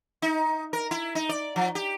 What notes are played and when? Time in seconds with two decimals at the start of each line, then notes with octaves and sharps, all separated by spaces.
0.22 D#4
0.73 A#4
0.91 E4
1.15 D#4
1.29 D5
1.56 F3
1.75 G4